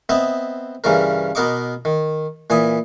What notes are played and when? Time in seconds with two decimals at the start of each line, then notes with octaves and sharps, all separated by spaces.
0.09 B3 C4 D#5 E5
0.84 G2 C#3 E3 C#4 A#4
1.35 B2 B3 A#4 D#5 C#6 D6
1.85 D#3
2.50 A#2 E3 G#5 D#6